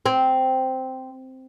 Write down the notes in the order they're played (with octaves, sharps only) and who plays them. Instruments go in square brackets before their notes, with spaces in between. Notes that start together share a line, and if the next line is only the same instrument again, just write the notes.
[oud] C4